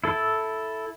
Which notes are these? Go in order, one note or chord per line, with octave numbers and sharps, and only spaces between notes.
E4 A4 A5